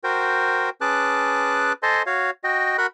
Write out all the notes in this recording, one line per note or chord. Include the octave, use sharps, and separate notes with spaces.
F#4 A#4 C5 G5
C#4 G#4 B4 A5 D6 F#6
A4 C5 D#5 G#5 A5 C6
F#4 C#5 F5
F#4 D#5 G5
F#4 A#4 F#5 B5 F#6